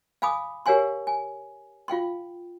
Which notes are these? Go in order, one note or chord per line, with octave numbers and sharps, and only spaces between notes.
F5 G#5 B5 D6 D#6
G4 A#4 C#5 F5 G#5 C6
G#5
F4 F5 G5 C6